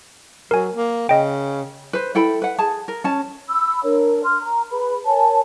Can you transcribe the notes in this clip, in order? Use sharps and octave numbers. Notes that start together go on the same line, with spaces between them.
F#3 A#4 G#5
A#3
C#3 D#5 G5
B4 C5
E4 A4 G5 B5
B4 F#5
G#4 A5
A#4
C#4 A5
B5 E6
D4 A#4 C#5
C6 F6
A#5
G#4 B4 B5
A#4 C#5 G#5 A5